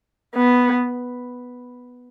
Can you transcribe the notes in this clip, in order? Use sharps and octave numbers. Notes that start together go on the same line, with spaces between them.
B3